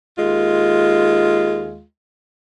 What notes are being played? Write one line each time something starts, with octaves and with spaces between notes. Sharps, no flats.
D#2 G#3 F4